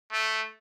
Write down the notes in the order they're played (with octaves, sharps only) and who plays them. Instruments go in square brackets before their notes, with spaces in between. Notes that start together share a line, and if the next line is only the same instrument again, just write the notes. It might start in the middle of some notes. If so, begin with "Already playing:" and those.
[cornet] A3